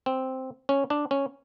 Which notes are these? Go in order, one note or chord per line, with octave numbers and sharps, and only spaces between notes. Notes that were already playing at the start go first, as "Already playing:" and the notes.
C4
C#4
D4
C#4